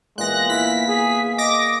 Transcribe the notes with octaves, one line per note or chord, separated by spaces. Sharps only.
A#2 E3 G#3 B3 F#6 A#6
E4 F4 F#5 B6
G#4
D#5 D6 A#6